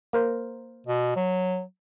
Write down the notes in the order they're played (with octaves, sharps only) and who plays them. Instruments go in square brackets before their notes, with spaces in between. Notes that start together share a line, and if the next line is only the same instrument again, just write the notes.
[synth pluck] A#3 A#4 C5
[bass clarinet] B2
F#3